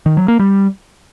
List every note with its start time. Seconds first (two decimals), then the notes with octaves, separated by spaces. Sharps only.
0.06 D#3
0.17 F#3
0.28 A#3
0.39 G3